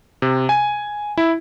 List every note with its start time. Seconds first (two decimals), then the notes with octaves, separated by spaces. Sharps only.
0.22 C3
0.49 G#5
1.17 E4